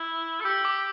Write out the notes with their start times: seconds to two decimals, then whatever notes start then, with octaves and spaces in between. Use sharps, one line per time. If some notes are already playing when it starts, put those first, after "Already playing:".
Already playing: E4
0.41 A4
0.45 G4 E6
0.65 D6